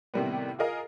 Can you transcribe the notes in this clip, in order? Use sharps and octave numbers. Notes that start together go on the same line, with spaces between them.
A2 C3 D#3 G3 A#3 B3
F4 G#4 A#4 D#5 F5